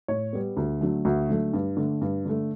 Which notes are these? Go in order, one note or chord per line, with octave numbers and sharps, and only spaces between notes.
A2 C#5
G3 B3
D2
D3 F#3 A3
D2 F#4
D3 F#3 A3
G2
D3 A3
G2
D3 A3